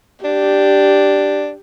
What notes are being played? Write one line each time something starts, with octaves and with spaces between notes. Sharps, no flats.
D4 G4